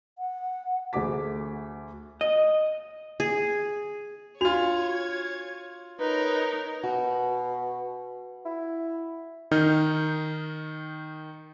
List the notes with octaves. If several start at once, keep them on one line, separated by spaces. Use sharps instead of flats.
F#5
D2 A3 G#4 D6 B6
D#5
G#4
D4 F4 F#4 C#5 G#6 F7
D#4 A#4 B4 C#5
B2 F#4
E4
D#3 D#4 F6 G6